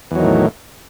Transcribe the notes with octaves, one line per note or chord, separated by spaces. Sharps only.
E2 A2 D#3 F#3